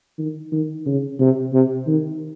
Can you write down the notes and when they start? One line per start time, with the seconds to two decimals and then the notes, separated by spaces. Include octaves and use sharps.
0.18 D#3
0.52 D#3
0.86 C#3
1.20 C3
1.53 C3
1.87 D#3